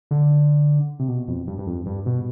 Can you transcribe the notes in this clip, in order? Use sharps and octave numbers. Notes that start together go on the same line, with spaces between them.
D3
C3
B2
F2
G2
G2
F2
G2
B2